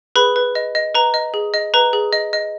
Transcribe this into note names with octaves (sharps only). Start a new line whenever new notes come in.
G#4 B4 B5
B4
D#5
D#5
B4 A#5
D#5
G#4
D#5
B4 A#5
G#4
D#5
D#5